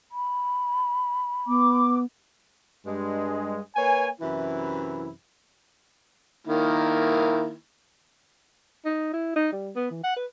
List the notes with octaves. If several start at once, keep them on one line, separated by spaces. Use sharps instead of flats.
B5
B3 D6
G2 G#3
A#3 B4 C#5 G#5
F#2 C3 E3 E4
D#3 A#3 E4
D#4
E4
D#4
G3
B3
E3
F#5
B4